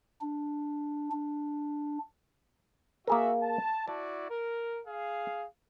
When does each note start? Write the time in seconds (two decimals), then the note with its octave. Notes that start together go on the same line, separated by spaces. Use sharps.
0.21 D4
1.12 D4
3.07 A#3 F#4 G#4 A#4 E5
3.42 A5
3.88 E4 F#4 D5 A5
4.30 A#4
4.87 G#4 F5